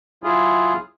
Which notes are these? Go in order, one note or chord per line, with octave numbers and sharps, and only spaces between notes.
F#3 E4 F4 G#4